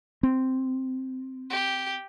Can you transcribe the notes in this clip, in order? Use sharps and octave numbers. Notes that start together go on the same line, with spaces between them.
C4
G4